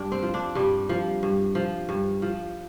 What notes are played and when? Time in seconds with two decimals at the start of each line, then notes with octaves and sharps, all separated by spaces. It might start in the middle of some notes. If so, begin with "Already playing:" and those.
Already playing: G2 D4
0.12 C4
0.23 F3
0.34 D4
0.55 G2 G3
0.89 F3
1.23 G2
1.55 F3
1.89 G2
2.22 F3